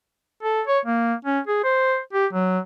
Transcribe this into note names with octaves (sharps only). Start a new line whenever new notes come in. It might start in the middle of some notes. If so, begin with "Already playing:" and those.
A4
C#5
A#3
C#4
G#4
C5
G4
F#3